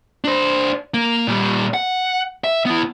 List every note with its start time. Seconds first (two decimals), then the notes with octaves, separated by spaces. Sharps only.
0.24 D4 C5
0.94 A#3
1.27 A#2 G3
1.74 F#5
2.44 E5
2.66 B3 E4